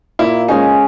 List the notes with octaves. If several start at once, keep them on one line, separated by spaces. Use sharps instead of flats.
A#2 E4
G#3 C#4 D#4 G#4